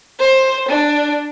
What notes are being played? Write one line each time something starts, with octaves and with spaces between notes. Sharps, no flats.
C5
D4